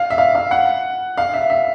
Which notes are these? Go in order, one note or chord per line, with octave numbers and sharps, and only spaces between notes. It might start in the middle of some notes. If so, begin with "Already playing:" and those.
Already playing: F5
E5
F5
F5
F#5
F5
E5
E5